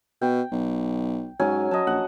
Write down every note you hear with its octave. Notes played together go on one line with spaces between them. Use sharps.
B2 G5
B1
G#2 F#3 C#4 G#5
F#3 D#5 A5
A#1 F#5